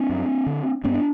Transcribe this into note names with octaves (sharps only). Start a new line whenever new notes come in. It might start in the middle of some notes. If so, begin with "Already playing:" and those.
Already playing: C4 D4
F#2
D3
G2 B3 C#4
D4